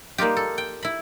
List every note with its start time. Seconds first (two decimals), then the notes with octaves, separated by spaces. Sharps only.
0.18 G3 A#3 D#4 F4 G4
0.37 A4
0.58 G5
0.83 E4 B5